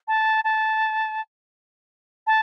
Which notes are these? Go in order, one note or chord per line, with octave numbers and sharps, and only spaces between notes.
A5
A5
A5